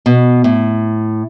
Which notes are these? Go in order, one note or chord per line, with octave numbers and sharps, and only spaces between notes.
B2
A2